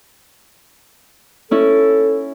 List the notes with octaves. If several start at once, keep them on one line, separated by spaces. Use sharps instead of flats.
C#4 E4 A4